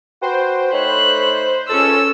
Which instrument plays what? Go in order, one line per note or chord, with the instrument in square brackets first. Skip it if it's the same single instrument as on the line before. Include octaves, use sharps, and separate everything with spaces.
[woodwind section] F#4 B4 G5 [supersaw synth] C5
[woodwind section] A3 D#4 C#5 [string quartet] B5 F#6
[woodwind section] C#2 [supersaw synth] C#4 A4 [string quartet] E6